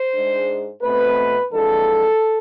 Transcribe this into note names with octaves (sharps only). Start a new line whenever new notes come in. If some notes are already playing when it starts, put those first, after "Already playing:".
Already playing: C5
G#2 G#3 D4
B2 A3 C4 B4
F2 E3 G#3 D4 A4